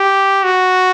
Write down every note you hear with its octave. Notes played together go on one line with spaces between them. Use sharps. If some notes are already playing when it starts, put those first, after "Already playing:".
Already playing: G4
F#4